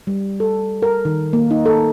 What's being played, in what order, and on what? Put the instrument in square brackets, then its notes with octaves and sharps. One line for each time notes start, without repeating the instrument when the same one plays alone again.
[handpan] G3
A4
A#4
D#3
A#3
D#4
A4